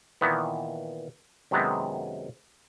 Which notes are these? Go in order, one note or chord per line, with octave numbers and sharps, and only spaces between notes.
A#2 D#3 E3 B3
F#2 C3 D#3 G#3 B3 C4